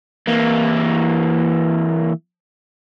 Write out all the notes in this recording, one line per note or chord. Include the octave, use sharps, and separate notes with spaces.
E3 A#3